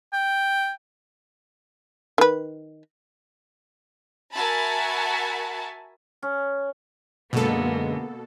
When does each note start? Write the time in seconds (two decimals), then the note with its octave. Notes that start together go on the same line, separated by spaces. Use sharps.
0.13 G5
2.18 D#3 B4
4.32 F#4 A#4 E5 G#5 A5 B5
6.22 C#4
7.33 F#2 B2 D3 G#3 A#3 B3 A4